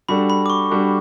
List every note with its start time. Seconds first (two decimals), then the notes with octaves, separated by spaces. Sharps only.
0.09 G3 D4 F#4 A4 B5
0.30 B5
0.46 D6
0.50 C#6
0.70 G3 D4 F#4 A4